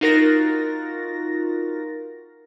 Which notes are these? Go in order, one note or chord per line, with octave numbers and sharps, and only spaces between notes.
D#4 F4 F#4 A#4 A6 A#6